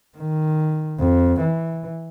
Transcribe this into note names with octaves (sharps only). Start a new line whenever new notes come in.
D#3
F2
E3